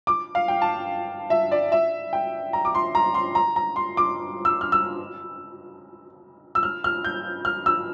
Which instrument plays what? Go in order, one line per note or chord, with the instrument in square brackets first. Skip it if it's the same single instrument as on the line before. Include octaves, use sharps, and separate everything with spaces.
[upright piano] D6
F5
G5
A5
E5
D5
E5
G5
A#5
D6
C6
A#5
C6
A#5
A#5
C6
D6
E6
F6
E6
E6
F6
F6
G6
F6
E6